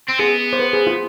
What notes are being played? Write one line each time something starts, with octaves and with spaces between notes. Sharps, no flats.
C4
B3 G#4
C5
B4
G#4
F4